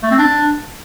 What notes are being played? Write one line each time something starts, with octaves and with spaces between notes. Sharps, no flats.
A3
C4
D4